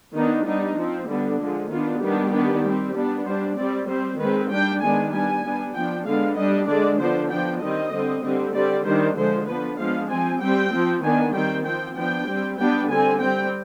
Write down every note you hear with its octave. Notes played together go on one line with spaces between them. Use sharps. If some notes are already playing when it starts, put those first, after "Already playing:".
D#3 B3 D4 D#4
G3 B3 D4 D#4
F3 C4
D3 G3 B3 D4
D3 F3 G#3
D#3 B3 D4 F4
D#3 G3 B3 D4 G4
D#3 B3 D4
G3 C4
G3 B3 D4
G3 D4 C5
G3 C4 D5
G3 C4 C5
D#3 G#3 C4 B4
G3 D4 G5
D#3 G#3 B3 D4 G#5
G3 B3 D4 G#5
G3 B3 D4
F3 B3 D4 G5
D3 G#3 B3 D4 F5
G3 D4 D#5
D3 G#3 D4 D5
D3 F3 B3 D4 C5
F3 B3 D4 G5
D#3 G3 C4 D#5
D3 G3 C4
D3 G3 C4
D3 G3 C4 D5
D#3 G3 D4 C5
D3 F3 G#3 C5
F3 B3 D4 B4
F3 G#3 B3 D4 F5
F3 C4 G#5
G3 C4 G5
F3 C4
D#3 B3 D4 G#5
D#3 G3 C4 G5
F3 C4 G5
F3 B3 D4 G5
G3 C4
G3 B3 D4 G5
D3 G3 C4 G#5
G3 C4 G5